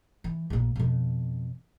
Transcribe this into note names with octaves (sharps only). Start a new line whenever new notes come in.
E3
A#1 A#2
F2 B2